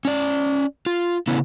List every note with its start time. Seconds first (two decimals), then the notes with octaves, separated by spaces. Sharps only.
0.05 C#4 D5
0.86 F4
1.27 C#3 B3 C#4 E4